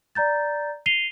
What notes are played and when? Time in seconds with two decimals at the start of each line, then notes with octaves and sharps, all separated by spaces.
0.15 D5 A#5 G6 A6
0.86 C7 D#7 F7 G7